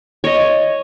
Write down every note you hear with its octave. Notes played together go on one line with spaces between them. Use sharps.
C#5 D#5